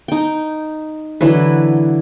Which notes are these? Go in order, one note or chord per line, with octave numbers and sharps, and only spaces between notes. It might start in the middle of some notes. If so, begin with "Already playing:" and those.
D#4 G5
D3 E3 F#3 B4